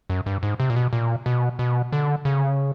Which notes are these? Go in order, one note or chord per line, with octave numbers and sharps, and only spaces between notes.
F#2
G2
G#2
C3
A#2
B2
A#2
B2
B2
D3
C#3